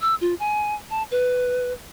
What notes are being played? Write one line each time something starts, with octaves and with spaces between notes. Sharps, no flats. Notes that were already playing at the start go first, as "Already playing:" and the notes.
E6
F4
G#5
A5
B4